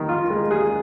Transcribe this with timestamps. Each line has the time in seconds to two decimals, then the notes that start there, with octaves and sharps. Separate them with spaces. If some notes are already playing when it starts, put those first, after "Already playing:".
Already playing: D#3
0.09 F4
0.30 G#3
0.51 G#4